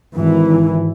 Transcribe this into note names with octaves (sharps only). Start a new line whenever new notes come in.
G#1 E3